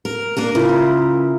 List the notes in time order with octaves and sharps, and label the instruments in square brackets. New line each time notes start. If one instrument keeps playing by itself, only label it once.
[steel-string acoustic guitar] A#4
A#3 D4 A#4
[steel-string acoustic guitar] C#3 [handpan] E4 F4 A#4